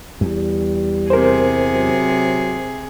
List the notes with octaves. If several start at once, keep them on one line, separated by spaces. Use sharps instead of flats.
E2 G3
C3 G#4 A#4 C5
F#3